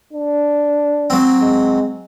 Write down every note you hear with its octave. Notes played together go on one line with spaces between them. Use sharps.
D4
F#3 C4
G#3